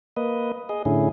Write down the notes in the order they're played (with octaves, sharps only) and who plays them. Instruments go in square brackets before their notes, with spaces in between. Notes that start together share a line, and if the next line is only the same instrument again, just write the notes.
[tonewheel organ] A#3 B4 D#5
G#4 D#5
A2 D3 C#4 E4 G#4